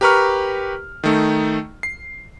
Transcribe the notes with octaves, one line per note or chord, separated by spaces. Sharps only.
G4 A#4 B4 A#5 C#6 F6
D#3 A3 D#4
C7